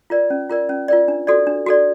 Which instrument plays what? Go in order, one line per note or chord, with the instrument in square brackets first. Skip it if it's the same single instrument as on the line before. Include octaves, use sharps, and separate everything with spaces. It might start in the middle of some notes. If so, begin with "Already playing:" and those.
[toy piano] F4 A#4 D5
C#4
F4 A#4 D5
C#4
F4 A#4 D5
D4
F#4 A4 D5
D4
F#4 A4 D5